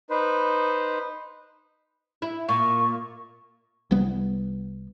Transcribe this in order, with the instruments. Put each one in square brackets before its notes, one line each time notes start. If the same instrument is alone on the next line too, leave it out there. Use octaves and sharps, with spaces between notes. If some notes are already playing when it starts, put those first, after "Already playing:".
[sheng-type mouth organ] D#4 B4 C5
[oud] E4
[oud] A#2 [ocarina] C#6
[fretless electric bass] C2 G3 B3